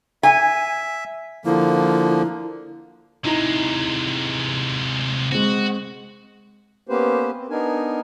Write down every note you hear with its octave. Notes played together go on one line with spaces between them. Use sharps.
E5 G#5
D3 F3 A#3 E4
C3 G#3 D#4 E4 A#5
G#3 C4 F#4
A#3 B3 C#4 G4 B4 C5
C4
B3 D4 D#4 A#4 G#5